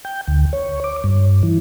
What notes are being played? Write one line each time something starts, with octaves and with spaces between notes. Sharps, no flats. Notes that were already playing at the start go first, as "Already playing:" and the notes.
G5
D2
C#5
D6
G2
E3